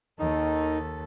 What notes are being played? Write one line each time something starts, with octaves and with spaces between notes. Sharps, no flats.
D#2 D#3 D#4 A4